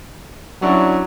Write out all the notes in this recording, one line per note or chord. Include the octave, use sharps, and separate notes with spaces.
F#3 C#4 D4 E4